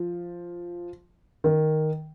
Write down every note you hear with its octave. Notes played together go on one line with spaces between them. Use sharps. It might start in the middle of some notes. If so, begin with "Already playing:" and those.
Already playing: F3
D#3